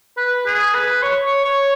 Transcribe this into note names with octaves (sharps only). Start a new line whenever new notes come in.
B4
G#4
B4
C#5
C#5
C#5